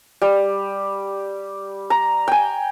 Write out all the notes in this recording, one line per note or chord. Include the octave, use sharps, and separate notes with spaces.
G3
A#5
G5 G#5